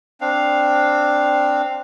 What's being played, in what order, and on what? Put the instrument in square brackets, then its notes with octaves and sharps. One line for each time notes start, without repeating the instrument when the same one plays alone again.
[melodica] C4 D4 F5